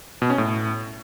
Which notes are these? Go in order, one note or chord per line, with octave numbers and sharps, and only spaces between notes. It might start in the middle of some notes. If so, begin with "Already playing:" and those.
B2
C#4
A2